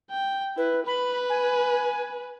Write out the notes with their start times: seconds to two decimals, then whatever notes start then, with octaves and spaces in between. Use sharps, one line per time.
0.11 G5
0.57 E4 B4
0.86 B4 B5
1.29 G#5